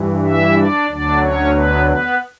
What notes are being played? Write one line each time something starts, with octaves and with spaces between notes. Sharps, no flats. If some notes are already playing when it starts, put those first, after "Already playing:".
Already playing: G2 E3
E4 E5
D4 D5
D2 D3 F#3 D4 D5
C#4 C#5
B3 B4
B3 B4